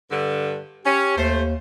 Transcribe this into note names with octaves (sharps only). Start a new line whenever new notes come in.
G2 D3
C#4 G4
D#2 A3 C5